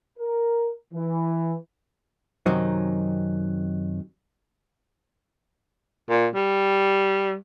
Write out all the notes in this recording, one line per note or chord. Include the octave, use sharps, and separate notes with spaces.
A#4
E3
F#2 C3 D#3 F#3 C4 D#4
A#2
G3